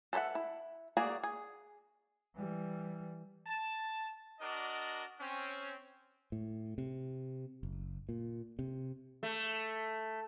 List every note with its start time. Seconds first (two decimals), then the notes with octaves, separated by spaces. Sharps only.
0.13 A4 B4 C5 E5 F#5
0.35 E4
0.97 A#3 F#4 G#4 D5
1.23 G#4
2.35 E3 G3
3.47 A5
4.41 D4 F#4 A#4 D5 D#5
5.20 C4 C#4
6.32 A2
6.78 C3
7.63 F#1
8.09 A#2
8.59 C3
9.23 A3